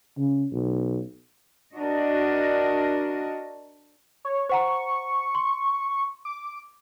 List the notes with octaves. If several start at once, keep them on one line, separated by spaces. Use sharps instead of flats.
C#3
B1
D4 F#4 A#4 D#5
C#5
C5 F#5 A#5 C#6
C6
D6